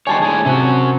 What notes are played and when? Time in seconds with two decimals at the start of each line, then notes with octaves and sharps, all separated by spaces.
0.07 D#3 G3 C#5 G#5 A5 C6
0.22 A2 D4 G#4
0.45 C3 C#4 F#4